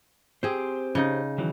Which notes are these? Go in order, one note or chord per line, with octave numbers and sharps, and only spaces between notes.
C4 G4 G#4 C5
C#3 D#4
D#3 E3 F#3